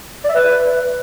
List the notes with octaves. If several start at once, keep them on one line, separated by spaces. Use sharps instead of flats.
D5
E5
B4